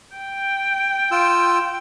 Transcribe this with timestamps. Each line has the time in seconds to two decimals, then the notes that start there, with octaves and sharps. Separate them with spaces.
0.16 G5
1.11 F4 E6